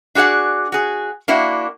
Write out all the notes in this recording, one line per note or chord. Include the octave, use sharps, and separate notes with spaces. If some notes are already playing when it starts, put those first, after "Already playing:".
D4 F#4 G#4 D5 F#5
F#4 G#4
A#3 D4 E4 F#4